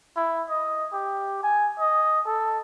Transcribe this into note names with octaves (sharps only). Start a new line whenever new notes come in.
E4
D#5
G4
G#5
D#5
A4